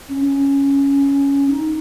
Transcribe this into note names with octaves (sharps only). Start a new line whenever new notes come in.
C#4
C#4
D#4